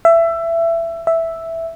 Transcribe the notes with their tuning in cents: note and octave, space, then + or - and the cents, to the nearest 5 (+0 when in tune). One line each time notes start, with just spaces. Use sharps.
E5 +20
E5 +0